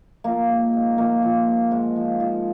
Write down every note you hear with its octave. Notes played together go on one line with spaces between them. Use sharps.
F3 A#3
G#2
G#2
F3 A#3
F3
G#2
G#2
F3
F3